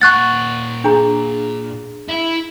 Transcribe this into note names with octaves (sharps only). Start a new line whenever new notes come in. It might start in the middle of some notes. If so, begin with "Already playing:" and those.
A#2 F#5 C#6 F#6 A6
D4 G#4 A#5
E4 E5